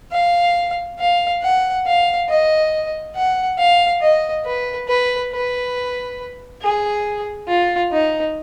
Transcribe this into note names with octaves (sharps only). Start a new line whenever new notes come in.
F5
F5
F#5
F5
D#5
F#5
F5
D#5
B4
B4
B4
G#4
F4
D#4